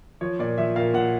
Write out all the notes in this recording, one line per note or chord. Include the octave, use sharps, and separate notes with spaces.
F3 C#5
A#2 D5
F3 E5
A#2 F5
A#2 F#5